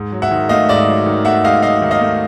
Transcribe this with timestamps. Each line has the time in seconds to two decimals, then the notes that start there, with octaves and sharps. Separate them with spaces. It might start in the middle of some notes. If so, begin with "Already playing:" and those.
Already playing: G#2
0.12 F#3
0.22 E5 F#5
0.31 D#3
0.49 A3 D#5 F5
0.69 G#2 D5 E5
0.88 F#3
1.06 D#3
1.25 A3 E5 F#5
1.44 G#2 D#5 F5
1.62 F#3 D#5 F5
1.82 D#3
1.91 D#5 F5
2.01 A3